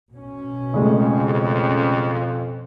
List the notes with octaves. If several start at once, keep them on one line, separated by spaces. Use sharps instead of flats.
B2 C#4
F2 C#3 G#3 A3